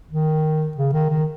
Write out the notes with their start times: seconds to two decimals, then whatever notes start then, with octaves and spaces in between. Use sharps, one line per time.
0.11 D#3
0.77 C#3
0.93 D#3
1.10 D#3